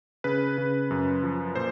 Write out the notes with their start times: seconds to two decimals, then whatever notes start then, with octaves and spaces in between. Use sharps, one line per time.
0.24 C#3 B4
0.58 C#3
0.91 F#2
1.23 F3
1.55 A#2 C5